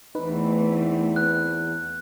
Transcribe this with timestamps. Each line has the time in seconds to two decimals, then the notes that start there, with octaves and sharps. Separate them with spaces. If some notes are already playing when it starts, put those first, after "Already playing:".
0.15 E2 E3 A3 C4 D#4 B4
1.16 F#6